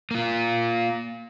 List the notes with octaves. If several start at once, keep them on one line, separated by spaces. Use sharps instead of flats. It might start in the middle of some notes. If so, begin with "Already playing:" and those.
A#3 F4